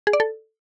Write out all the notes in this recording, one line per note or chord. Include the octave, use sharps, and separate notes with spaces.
G#4
D5
A4